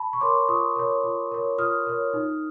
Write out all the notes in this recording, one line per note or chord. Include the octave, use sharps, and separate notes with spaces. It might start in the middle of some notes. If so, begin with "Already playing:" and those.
Already playing: A5 B5
C#6
A#4 C#5 C6 D6
F4 C#6 D#6
A#4 C#5
F4
A#4 C#5
F4 D#6 F6
A#4 C#5
D#4